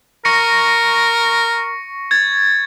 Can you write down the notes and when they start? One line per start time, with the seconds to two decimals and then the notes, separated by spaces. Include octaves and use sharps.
0.25 A#4 C#6 A#6 C#7
2.11 G#6 A6